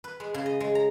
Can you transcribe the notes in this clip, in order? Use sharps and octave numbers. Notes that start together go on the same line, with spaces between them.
B4
G#3
C#3
D#5
G#3
A#5